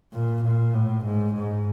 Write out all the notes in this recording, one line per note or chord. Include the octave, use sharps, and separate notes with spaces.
A#2
A#2
A2
G#2
G#2